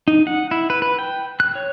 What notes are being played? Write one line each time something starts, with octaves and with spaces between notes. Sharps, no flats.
D#4
F#5
E4
B4
B4
G5
F#6
C#5